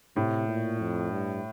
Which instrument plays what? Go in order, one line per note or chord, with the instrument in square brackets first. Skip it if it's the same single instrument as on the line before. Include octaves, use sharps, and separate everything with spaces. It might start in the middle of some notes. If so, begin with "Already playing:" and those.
[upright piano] A2 [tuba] C3
[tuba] A#2
F2
G2